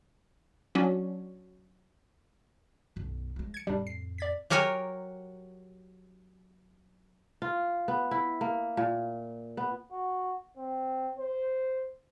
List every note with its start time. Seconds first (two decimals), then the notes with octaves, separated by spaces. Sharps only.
0.75 F#3 C#4 D4
2.96 B1 F#2
3.36 F3 G#3
3.54 G#6 C#7
3.67 F2 A2 G3 D4
3.87 C7
4.18 D5 G#6 B6
4.50 F#3 G4 A#4 C#5 G#5
7.42 F4
7.88 B3
8.11 E4
8.41 A#3
8.77 A#2
9.57 B3
9.92 F#4
10.57 C4
11.19 C5